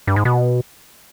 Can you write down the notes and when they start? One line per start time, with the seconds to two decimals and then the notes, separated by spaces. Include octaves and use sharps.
0.07 G2
0.16 G#2
0.25 B2